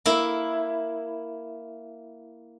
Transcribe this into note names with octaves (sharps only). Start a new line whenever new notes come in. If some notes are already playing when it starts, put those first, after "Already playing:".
A#3 E4